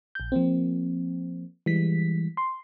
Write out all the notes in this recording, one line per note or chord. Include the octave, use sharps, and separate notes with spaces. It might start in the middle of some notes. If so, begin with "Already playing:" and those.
A#1 G6
F3 A#3 C4
E3 G3 G#3 B6
C6